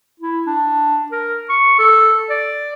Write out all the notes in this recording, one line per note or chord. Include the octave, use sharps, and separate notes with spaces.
E4
D4
A#4
C#6
A4
D5